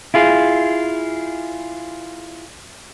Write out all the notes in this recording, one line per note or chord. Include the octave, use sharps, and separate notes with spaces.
E4 F4 G#4